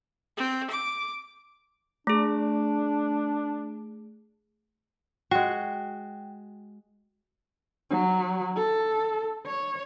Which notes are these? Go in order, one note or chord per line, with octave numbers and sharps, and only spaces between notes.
C4
D6
A3 D4 G#4
G#3 F#4 G5
F#3
A4
C#5